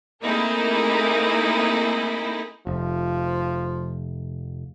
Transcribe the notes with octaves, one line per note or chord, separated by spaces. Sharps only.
A3 A#3 C4 D#4 E4 G#4
F1 F3